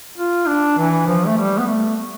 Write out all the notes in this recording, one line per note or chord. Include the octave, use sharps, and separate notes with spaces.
F4
D4
E3
F3
A3
G3
B3
A3